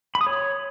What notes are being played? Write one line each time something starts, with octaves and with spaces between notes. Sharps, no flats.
B5
D#6
C#5